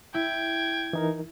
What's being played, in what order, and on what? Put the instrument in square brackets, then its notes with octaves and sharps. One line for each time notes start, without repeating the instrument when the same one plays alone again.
[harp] E4 [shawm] G5 [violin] G#6
[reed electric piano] E3 D#4 A#4